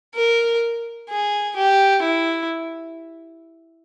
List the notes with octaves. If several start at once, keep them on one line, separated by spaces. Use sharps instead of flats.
A#4
G#4
G4
E4